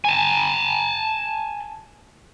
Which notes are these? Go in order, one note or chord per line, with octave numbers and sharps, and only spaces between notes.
G#5 A5